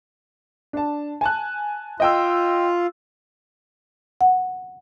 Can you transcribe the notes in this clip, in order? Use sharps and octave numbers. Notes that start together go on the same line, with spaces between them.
D4 A5
G#5 A5 F#6
F4 D#5 G5 E6
F#5